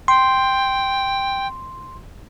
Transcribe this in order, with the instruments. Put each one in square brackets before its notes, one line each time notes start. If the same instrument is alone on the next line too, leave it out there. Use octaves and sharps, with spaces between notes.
[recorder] G5 [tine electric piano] C6